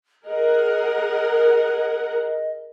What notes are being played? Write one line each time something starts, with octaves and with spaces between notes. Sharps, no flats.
G#4 A#4 D#5 F#5